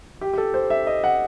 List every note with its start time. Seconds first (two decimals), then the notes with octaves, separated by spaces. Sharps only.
0.21 G4
0.33 G4
0.38 A4
0.54 C5
0.70 E5
0.87 D#5
1.04 F#5